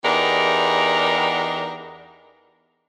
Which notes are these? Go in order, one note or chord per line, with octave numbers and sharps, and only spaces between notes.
E2 D4 D#4 G4 A#4